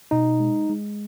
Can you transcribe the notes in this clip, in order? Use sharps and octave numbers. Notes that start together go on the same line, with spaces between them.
B2 D#4
G#3
G#3